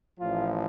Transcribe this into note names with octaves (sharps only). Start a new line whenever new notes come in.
A1 A2 F3 F4